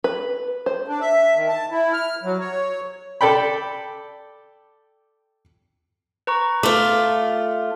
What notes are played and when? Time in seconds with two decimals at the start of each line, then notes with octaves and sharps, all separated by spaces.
0.04 B4
0.66 C5
0.87 D4
1.01 E5
1.35 D#3
1.48 A5
1.71 E4
1.93 F6
2.23 F#3
2.40 C#5
3.21 A4 D5 G5 B5
6.27 B4 A#5 C#6
6.63 A3 F4 D6